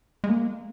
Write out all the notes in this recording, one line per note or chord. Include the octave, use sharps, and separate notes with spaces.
G#3
A#3